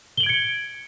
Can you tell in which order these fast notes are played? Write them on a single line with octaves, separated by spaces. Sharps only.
G7 F#7 D7 G#6 C#7